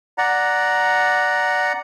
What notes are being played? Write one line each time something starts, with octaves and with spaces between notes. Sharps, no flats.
D5 F#5 A#5